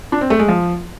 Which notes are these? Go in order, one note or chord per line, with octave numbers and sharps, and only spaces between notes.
D4
C4
A3
G#3
F3